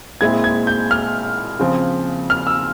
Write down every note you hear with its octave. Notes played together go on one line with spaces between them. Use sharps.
A#2 G#3 C4 E4 G#6
G#6
G6
F6
C#3 F3 C4
F6
E6